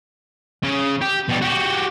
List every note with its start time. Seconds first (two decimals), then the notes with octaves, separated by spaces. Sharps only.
0.63 C#3
1.02 G4
1.29 B2 G3
1.42 F#4 G4